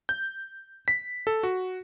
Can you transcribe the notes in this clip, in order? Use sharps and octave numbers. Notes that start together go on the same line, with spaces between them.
G6
B6
A4
F#4